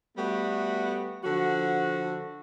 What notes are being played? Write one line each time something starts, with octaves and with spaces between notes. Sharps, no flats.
G3 A3 B3 F#4
D3 F3 F#4